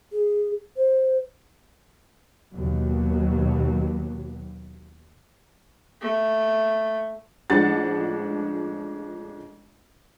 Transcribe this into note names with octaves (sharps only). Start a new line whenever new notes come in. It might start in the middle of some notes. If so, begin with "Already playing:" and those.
G#4
C5
D#2 B2 F#3
A3
A1 F3 G#3 D4 F#5 A6